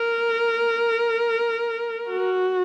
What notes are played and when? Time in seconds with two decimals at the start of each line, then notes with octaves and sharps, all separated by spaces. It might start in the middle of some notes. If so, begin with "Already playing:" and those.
Already playing: A#4
2.09 F#4